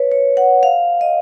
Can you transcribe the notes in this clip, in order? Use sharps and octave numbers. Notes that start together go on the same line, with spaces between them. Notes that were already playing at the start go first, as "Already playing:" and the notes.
Already playing: B4 C#5
C#5
F#5
F5
D#5